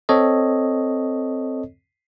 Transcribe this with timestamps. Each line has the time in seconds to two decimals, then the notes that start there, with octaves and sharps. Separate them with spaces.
0.09 C4 A4 C#5 D#5